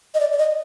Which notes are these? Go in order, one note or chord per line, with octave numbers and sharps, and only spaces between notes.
D#5
D5
D5
D#5